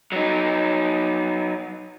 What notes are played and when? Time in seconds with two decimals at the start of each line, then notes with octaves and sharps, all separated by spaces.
0.12 F#3 D#4